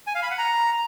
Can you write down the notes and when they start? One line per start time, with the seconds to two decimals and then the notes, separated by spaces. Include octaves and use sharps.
0.07 G#5
0.15 F5
0.23 B5
0.31 F#5
0.38 A#5